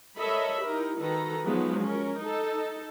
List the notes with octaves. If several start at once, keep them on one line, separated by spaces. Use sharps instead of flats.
A4 A#4 C#5 D#5 E5 B5
D#4 E4 G4 A#4
D#3 F#4 A4 B4 A#5
F3 F#3 G#3 B3 D#4
C#4 A#4
D#4 A4